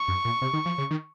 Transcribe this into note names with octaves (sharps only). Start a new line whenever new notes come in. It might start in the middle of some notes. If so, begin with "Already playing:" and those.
Already playing: C#6
F#2
A#2
C3
D#3
F3
C#3
D#3